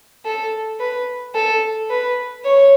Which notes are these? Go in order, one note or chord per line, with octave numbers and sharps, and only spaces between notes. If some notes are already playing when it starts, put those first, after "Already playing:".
A4
B4
A4
B4
C#5